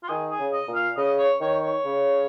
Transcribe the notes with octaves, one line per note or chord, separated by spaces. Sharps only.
F4
D#3 G#4
G#4
C#3
D#5
A#2
F5
C#3 D#5
C#5
D#3 C#5
C#5
C#3